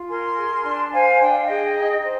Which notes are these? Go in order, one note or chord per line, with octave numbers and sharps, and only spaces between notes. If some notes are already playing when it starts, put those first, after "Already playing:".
Already playing: F4
A#4 G#5 C6
G#4
D4
C5 F5 G#5
D4 G5
F5
G#4 D#5 G5
D#4
C5 D#5